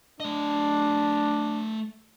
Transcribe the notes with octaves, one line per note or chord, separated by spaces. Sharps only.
A3 D4 D#5